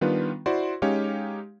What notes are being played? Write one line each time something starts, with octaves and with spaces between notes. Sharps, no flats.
D#3 G3 B3 D4 F4 B4
E4 F#4 C5 D5 C6
G#3 C#4 D#4 G4 C#5 F5